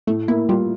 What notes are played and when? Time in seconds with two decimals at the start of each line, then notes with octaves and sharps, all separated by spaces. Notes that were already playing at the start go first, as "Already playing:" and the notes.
0.07 A2 A3
0.28 A#3 E4
0.49 G3 F4